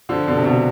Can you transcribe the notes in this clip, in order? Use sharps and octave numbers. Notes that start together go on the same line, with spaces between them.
D3 F3
B2 D3
C3
B2 D3